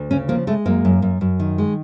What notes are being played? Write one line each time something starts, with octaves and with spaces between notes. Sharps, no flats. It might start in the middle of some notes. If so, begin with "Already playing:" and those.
Already playing: D2
C#3 C#4
F3 A#3
G#3 A3
F#2 A#3
F#2
F#2
F#2
D#3
G#3